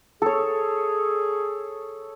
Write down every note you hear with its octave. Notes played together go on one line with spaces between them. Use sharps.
G#4 A4 C#5